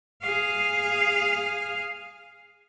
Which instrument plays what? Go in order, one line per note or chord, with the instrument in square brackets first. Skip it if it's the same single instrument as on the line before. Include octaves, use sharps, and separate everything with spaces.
[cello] G#4 F5